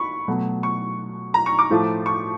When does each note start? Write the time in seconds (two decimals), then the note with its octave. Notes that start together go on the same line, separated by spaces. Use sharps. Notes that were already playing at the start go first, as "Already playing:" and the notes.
Already playing: B5 C#6
0.28 B2 F#3 A3
0.63 C#6
1.34 A#5
1.46 C#6
1.59 D6
1.70 A2 F3 A3
2.06 C#6